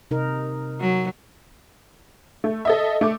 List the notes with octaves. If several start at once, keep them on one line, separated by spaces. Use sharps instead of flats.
C3 D#4 A#4
F#3
A3
A4 D#5 E5
A3 D6